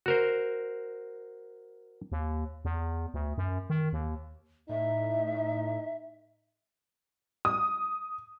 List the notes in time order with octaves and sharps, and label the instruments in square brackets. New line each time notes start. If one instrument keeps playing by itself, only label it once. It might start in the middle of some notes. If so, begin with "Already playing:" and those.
[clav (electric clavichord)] F#4 A#4 C5
[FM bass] D#2
E2
D2
F#2
D#3
D#2
[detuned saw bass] A2 [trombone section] D#4 [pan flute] E5
[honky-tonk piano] D#6